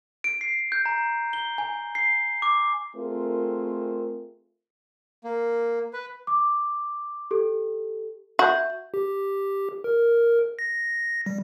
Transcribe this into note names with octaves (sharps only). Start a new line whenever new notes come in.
D7
C7
G6
A#5
G7
G#5
C7
D6
A3 C4 F4 G#4 A#4
A#3
B4
D6
G4 A4
F#4 E5 G6
G4
A#4
A#6
G3